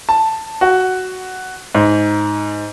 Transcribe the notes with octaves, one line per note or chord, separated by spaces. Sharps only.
A5
F#4
G#2